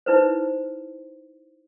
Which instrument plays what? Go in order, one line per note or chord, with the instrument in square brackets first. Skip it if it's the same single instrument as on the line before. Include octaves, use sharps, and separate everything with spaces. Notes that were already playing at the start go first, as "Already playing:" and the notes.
[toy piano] D#4 E4 B4 C5